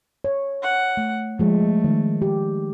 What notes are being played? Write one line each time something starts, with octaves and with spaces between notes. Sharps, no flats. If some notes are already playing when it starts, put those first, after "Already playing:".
C#5
F#5
A3
F3 G#3 A3
D#3
G4